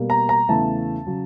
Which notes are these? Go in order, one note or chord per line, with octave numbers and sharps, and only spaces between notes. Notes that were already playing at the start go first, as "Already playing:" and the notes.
Already playing: B2 G3 A#3
A#5
A#5
E2 C#3 E3 A3 A5
C#3 F#3